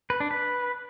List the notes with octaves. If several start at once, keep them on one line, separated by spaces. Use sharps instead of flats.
B4
D4
B4